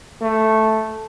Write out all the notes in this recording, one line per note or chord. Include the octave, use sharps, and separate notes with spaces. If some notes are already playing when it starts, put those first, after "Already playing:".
A3